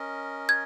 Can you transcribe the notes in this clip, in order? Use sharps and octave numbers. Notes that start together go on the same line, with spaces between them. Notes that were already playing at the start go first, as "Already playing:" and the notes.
Already playing: C#4 A#4 D#5
G#6